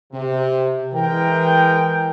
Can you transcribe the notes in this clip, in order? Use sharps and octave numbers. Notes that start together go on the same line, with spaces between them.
C3
E3 G#3 A#4 G5